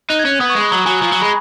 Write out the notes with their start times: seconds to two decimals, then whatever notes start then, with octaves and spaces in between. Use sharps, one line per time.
0.09 D#4 F#6
0.19 G#6
0.25 C#4
0.30 F#6
0.40 B3 D#6
0.50 C#6
0.55 G#3
0.60 B5
0.71 F#3 A#5
0.86 F#3 G#5
1.01 F3 A#5
1.12 F#3
1.22 G#3 B5